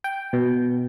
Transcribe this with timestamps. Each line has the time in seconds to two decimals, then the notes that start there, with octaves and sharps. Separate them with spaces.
0.04 G5
0.33 B2